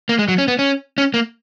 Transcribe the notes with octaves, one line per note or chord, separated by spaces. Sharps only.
A#3
G#3
F#3
C#4
B3
C#4
C#4
A#3